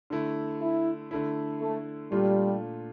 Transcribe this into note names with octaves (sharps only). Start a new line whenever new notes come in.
D3 A3 E4
E4
D3 A3 E4
A3
A#2 G3 A3 D4 F4